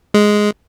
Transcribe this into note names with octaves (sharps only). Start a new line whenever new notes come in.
G#3